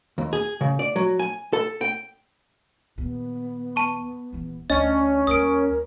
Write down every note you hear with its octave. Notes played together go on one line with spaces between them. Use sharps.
D#2
G#4
C#3
D5
F#3
G#5
A4
G5
D#2 A#2 B3
A5 C#6
D#1 E3
D2 C#4 D4 D#5
D#2 G3 A#4 D#6 D7